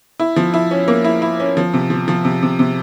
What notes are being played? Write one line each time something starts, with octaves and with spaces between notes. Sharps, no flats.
E4
F3
E4
C#4
A#3
E4
E4
C#4
F3
C3
F3
F3
C3
C3
C3